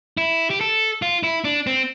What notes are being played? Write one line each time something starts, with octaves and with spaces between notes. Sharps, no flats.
E4
G4
A4
F4
E4
D4
C4